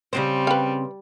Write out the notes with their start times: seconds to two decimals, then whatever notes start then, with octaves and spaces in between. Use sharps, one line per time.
0.13 C#3 G3 C4 C5
0.47 B4 F5 G5